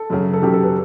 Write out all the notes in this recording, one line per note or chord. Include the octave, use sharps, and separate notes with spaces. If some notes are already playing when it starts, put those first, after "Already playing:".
Already playing: A4
F#2 C#3 F#3
A4
F#2 C#3 F#3 G4
A4
B4